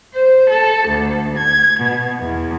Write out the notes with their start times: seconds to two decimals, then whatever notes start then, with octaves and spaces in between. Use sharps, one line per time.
0.14 C5
0.49 A4
0.87 D2
1.37 G#6
1.79 B2
2.20 E2